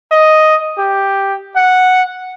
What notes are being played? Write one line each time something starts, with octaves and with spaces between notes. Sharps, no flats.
D#5
G4
F#5